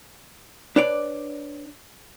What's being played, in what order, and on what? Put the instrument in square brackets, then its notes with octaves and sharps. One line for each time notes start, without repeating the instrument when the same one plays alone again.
[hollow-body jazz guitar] D4 B4 C#5 D5